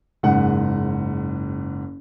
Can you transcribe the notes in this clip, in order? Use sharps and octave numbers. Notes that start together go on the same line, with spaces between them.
F#1 G#2 F#5